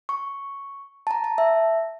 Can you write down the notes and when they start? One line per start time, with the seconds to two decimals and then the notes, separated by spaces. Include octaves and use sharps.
0.09 C#6
1.07 A5
1.11 A#5
1.24 A5
1.38 E5